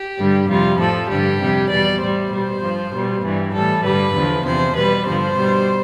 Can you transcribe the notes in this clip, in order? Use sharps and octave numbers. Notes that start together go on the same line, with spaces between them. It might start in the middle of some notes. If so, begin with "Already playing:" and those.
Already playing: G4
G2 D3 G3
F2 C3 G3 F4
A2 F3 A4
G2 D3 G3 G4
F2 C3 G3
E2 B2 G3 D5
A2 G3 C5
B2 G3
G2 F3
B2 G3
G2 E3 G3
A2 E3 G3 A4
G2 D3 G3 B4
E2 D3 F3
E2 C3 F3 C5
B2 G3 B4
G2 D3 F3 C5
B2 G3